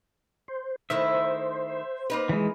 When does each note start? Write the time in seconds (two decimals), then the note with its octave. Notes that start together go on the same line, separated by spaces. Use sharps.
0.48 C5
0.90 D#3 A3 E4 C5 E5
2.10 A#3 D#4 B4
2.29 E3 G#3